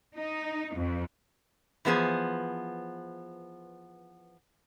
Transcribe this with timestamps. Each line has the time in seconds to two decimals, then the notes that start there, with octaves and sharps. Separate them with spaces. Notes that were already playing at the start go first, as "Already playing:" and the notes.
0.16 D#4
0.77 F2
1.85 E3 F3 B3 G#4 C5